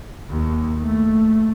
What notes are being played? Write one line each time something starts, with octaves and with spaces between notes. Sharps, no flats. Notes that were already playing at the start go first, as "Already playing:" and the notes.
D#2
A3